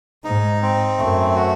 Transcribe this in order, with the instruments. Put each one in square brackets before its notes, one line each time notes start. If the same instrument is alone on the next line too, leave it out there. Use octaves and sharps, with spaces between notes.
[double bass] G#2 [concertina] D#4
[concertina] C4
[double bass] F#2 [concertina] A3
[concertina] F#4